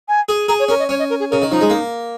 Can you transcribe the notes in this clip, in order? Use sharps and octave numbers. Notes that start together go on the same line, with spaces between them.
G#5
G#4
G#4 A#5
C#5
C#4 A#4
D#5
C#4 C#5
D#5
A#4
G#4
C#3 A#4
D#3
F3 D#4
G#3
A#3